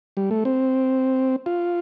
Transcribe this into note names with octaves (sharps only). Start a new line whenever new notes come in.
G3
A3
C4
F4